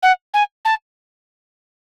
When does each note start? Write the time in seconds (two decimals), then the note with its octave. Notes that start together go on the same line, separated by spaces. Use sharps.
0.03 F#5
0.34 G#5
0.65 A5